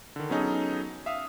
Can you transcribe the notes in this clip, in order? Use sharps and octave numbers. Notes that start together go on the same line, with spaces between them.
D3 D#3
F#3 B3 C#4 D#4 G#4 A4
E5 F5 D#6